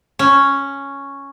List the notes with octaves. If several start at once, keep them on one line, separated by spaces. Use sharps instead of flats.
C#4